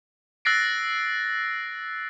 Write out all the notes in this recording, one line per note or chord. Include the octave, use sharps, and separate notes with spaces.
E6 F#6 A6 A#6 C7 D7